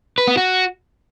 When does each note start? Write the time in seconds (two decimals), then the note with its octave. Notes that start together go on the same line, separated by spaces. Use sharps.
0.18 B4
0.28 B3
0.37 F#4